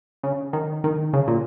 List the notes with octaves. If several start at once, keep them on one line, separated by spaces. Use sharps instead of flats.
C#3
D#3
D#3
C#3
A#2